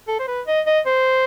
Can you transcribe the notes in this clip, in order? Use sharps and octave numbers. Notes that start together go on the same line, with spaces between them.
A4
C5
B4
D#5
D#5
C5